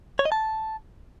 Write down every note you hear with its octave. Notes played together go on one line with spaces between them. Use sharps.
C#5
D#5
A5